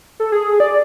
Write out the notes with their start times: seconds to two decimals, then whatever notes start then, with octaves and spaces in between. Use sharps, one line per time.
0.20 A4
0.32 G#4
0.60 D5